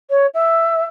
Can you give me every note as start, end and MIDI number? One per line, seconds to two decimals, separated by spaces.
0.09 0.26 73
0.34 0.84 76